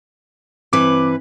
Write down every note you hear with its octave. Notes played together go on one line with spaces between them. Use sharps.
G2 E3 C4 B4 D6